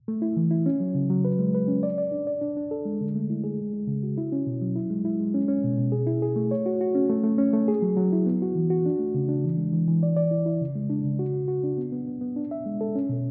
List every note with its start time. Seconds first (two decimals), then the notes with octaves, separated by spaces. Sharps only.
0.08 A3
0.22 E4
0.37 E3
0.51 E4
0.66 C#4
0.80 F#3
0.95 C#3
1.10 F#3
1.25 B4
1.39 G#3
1.54 B4
1.68 C#4
1.83 D5
1.98 D5
2.12 D4
2.27 D5
2.42 D4
2.57 D4
2.71 A4
2.85 G#3
3.01 D3
3.15 A3
3.30 E4
3.44 G#4
3.59 G#3
3.74 G#3
3.87 C#3
4.03 F#4
4.17 E4
4.32 C#4
4.47 B2
4.62 F#3
4.76 E4
4.90 G#3
5.05 E4
5.19 G#3
5.34 C#4
5.48 C#4
5.64 B2
5.78 B2
5.92 G#4
6.07 E4
6.22 G#4
6.36 A3
6.51 C#5
6.66 F#4
6.81 F#4
6.95 C#4
7.10 A3
7.24 A3
7.38 C#4
7.53 A3
7.68 G#4
7.82 F#3
7.97 F#3
8.13 E4
8.26 B3
8.42 F#4
8.56 E3
8.70 F#4
8.86 D4
8.99 A3
9.15 C#3
9.29 D4
9.44 E3
9.58 G#3
9.73 E3
9.88 E3
10.03 D5
10.17 D5
10.31 E4
10.46 E4
10.61 C#3
10.75 G#3
10.90 D4
11.04 C#3
11.19 F#4
11.34 F#4
11.48 F#4
11.64 D4
11.78 B3
11.92 B3
12.07 B3
12.21 B3
12.36 D4
12.51 E5
12.66 G#3
12.81 A4
12.95 C#4
13.09 B2